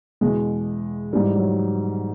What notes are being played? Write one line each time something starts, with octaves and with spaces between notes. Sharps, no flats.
E2 B2 G#3
G#2 E3 G3
F#3